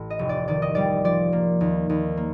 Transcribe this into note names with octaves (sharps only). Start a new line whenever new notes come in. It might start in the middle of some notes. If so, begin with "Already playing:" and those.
Already playing: A1
D#5
F1
D5
D#3 D5
D#5
G3 D5
F3 D5
A#3
D#2
D#2
A#3